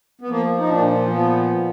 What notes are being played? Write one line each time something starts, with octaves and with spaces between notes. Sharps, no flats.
B3
F3 A#3
D#4
A#2 D4
F3 B3
A#2